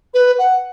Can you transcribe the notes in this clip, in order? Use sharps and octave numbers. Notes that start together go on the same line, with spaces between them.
B4
F#5